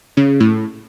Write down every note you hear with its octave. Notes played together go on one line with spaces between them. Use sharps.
C#3
A2